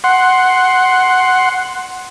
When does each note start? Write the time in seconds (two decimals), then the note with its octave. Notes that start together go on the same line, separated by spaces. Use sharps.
0.04 F#5 C6